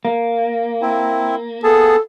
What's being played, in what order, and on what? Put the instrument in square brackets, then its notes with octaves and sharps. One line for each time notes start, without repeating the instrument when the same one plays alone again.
[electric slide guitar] A#3
[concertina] C4 E4
[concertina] B3 G#4 A5 [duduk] A4